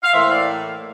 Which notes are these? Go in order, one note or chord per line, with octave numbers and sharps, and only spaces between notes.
F5
A2 E3 A#3 C5 E5
D5 F5